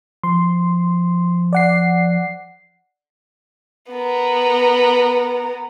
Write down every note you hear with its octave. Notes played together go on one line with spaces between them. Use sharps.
F3 C6
D5 F#5 C7
B3 A#4